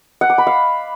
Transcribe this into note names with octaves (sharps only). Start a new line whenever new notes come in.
F#5
D6
B5
F5